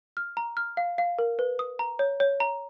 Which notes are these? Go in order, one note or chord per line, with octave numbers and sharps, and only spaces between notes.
F6
A#5
F6
F5
F5
A#4
B4
D#6
A#5
C#5
C#5
A#5